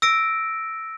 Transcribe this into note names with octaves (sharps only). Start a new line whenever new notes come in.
E6 A#6 D7